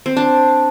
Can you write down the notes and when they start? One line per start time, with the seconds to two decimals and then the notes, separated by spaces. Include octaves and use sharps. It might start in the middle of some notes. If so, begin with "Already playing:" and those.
0.06 C4
0.17 D4